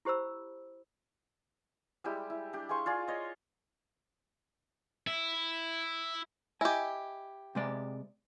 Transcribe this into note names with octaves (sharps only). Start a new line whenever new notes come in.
E4 G4 C5 B5 E6
G3 G#3 E4 G4
E4
D4 G4
G#4 F5 C6 C#6
F4 G#4 D5
C#5 D#5
E4
E4 G4 D#5 G#5
C3 G#3 D5